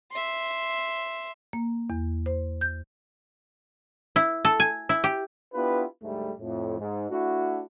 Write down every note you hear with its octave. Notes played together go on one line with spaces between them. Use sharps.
E5 C6
A#3
E2
C5
G6
E4
A4
G#5
E4
G4
B3 D4 E4 F4 G4 B4
D2 G#2 G3 A3
F2 A2
G#2
A3 D4 E4 F#4